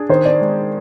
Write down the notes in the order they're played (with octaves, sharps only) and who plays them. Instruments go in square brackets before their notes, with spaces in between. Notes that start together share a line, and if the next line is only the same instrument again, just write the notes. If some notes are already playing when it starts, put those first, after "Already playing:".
Already playing: [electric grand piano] D4 G#4
[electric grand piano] D#3 [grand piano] C5
[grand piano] D5
[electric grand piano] G#3